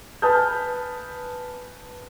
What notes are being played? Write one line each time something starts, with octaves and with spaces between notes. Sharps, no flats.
B4 G#5 A5 D#6 F6 G6